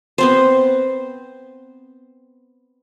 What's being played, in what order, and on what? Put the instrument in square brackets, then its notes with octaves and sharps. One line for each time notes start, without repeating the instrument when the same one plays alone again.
[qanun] B3 C4 C5